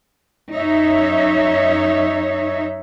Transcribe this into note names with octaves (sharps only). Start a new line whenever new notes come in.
F#2 D#4 C#5 E5